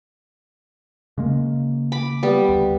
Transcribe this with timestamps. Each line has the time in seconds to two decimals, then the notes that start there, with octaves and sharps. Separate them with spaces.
1.18 C#3 G#3 A#3
1.92 B5 D6
2.23 G3 B3
2.49 D2